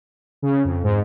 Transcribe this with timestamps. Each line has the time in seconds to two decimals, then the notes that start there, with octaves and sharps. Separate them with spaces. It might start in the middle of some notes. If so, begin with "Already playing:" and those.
0.42 C#3
0.64 F2
0.83 G#2